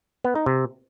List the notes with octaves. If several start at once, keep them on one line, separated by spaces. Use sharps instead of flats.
B3
D#4
C3